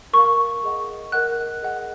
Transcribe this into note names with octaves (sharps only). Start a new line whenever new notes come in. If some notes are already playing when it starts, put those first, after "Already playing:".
A#4 F5 C#6
G#4 D#5 F#5
A#4 D#5 F#5 F#6
G#4 D#5 F#5